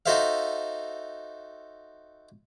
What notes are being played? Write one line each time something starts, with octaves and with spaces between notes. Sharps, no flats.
D#4 F#4 A4 C5 E5 F5